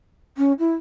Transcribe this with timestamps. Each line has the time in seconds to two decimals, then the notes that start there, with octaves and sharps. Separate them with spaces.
0.37 C#4
0.59 E4